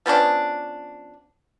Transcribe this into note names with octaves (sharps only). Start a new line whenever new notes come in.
F3 B3 C#4 D4